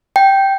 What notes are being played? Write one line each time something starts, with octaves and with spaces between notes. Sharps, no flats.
G5